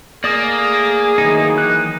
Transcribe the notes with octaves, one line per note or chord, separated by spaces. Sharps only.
A3 A#3 G#4 D5 D#6
D#3 E3 F#3 D#4
F#6